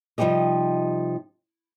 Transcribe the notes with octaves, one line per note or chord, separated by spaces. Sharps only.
C3 F3 G3 D#4 G4 D#5